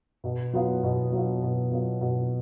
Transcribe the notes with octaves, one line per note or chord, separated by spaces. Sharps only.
B2
F#3 B3 F4
B2
F#3 B3 F4
B2
F#3 B3 F4
B2